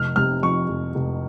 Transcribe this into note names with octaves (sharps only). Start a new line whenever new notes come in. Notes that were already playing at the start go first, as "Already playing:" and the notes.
Already playing: F1 F6
C3 F6
F2 C#6
F1
F1